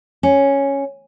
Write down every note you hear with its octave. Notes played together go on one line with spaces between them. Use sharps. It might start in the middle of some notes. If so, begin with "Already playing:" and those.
C#4